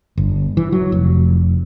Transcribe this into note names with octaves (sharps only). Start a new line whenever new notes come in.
G1
E3
F#3
F1